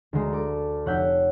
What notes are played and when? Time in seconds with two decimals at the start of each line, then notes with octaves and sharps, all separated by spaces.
0.13 D2 G#3 A#5
0.32 A4 D6
0.86 F1 C#5 F#5 E6 G6 B6